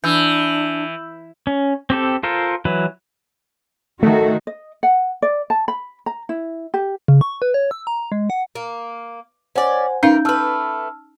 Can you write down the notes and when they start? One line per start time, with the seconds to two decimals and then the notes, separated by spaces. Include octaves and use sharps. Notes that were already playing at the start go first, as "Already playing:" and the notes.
0.04 E3 D4 E6 G6
1.47 C#4
1.90 C4 G4 A4
2.23 F4 A4 A#4 C5
2.65 E3 F#3 B4
4.03 D#3 A3 F#4
4.47 D#5
4.83 F#5
5.22 D5
5.50 A5
5.68 B5
6.06 A#5
6.29 E4
6.74 G4
7.08 C#3
7.21 C#6
7.42 B4
7.54 C#5
7.71 E6
7.87 A#5
8.12 G#3
8.30 F#5
8.55 A#3
9.56 C#4 C5 D5 F#5 G#5
10.03 E3 C#4 D#4 A#4 F5 G5 G6
10.25 A3 B4 A5 E6 F6